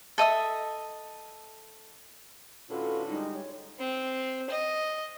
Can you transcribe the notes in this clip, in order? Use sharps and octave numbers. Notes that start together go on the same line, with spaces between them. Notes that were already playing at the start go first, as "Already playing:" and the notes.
A4 D#5 E5 D#6
A2 D3 C#4 F4 F#4 A4 B4
G3 G#3 D#4
C#5
C4
D#5